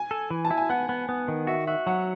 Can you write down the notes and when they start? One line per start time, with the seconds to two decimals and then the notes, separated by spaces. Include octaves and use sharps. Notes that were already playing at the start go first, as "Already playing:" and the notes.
Already playing: G#5
0.11 A4
0.30 E3
0.45 A5
0.51 E4
0.58 G#5
0.69 B3 F#5
0.89 B3
1.09 B3
1.28 D#3
1.47 F#4 E5
1.67 F#4 E5
1.87 F#3 F#5